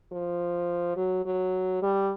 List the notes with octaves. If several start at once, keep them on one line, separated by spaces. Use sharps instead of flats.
F3
F#3
F#3
G3